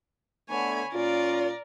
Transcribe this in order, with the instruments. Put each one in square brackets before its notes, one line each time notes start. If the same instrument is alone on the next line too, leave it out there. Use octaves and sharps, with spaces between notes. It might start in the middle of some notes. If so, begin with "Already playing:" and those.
[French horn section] D3 A3 B3 [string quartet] C#5 G#5 B5
[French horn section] A#2 C#4 F4 [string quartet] A#4 D5